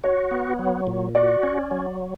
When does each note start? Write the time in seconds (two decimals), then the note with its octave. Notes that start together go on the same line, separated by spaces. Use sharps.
0.04 F#4 C#5
0.31 B3
0.59 F#3
0.87 A#2
1.15 F#4 D5
1.43 C#4
1.71 F#3